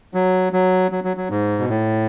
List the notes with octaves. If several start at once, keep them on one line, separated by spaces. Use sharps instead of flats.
F#3
F#3
F#3
F#3
F#3
G#2
B2
A2